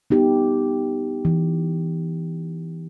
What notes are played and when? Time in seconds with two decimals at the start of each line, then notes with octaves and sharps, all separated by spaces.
0.10 B3 D#4 G4
1.25 E3